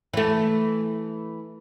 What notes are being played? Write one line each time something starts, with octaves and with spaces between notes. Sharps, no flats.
E3 A3